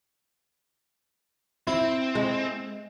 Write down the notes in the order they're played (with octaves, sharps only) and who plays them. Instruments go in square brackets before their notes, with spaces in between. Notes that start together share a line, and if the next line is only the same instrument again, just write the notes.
[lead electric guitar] C4 [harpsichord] E4
[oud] G#3